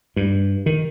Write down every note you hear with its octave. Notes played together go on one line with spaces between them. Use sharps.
G2
D#3